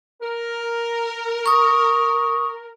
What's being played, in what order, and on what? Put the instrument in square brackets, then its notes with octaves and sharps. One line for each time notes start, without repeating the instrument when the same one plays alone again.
[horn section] A#4
[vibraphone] C#6 D#6